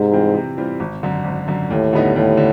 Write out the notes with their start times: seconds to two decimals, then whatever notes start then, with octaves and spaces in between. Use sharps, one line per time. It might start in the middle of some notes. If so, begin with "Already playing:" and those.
Already playing: G#2 C3
0.12 E3 G3 C4 F4
0.35 C3
0.57 E3 G3 C4 F4
0.80 G#1
1.03 F#2 D3
1.25 G#1
1.48 F#2 D3
1.70 D#2 A2
1.93 D3 G3 B3 D#4
2.16 D#2 A2
2.37 D3